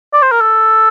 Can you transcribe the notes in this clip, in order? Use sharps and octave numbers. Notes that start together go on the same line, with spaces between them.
D5
C5
A#4
A4